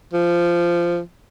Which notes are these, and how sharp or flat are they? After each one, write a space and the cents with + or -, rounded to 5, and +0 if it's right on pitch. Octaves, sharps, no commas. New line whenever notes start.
F3 -15